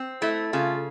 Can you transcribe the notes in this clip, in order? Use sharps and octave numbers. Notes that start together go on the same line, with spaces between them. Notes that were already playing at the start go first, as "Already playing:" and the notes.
Already playing: C4
A3 E4
C#3 F4